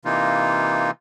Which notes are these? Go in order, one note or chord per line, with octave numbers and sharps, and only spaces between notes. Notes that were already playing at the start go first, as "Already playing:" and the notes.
C3 E3 A#3 D#4 F4